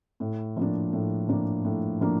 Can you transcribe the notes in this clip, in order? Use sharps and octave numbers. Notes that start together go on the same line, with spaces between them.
A2
F3 A#3 D4
A2
F3 A#3 D4
A2
F3 A#3 D4